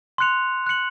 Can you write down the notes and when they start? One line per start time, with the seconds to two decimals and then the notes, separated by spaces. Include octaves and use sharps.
0.18 C6 F#6 C#7 F7
0.66 F#6 C#7 F#7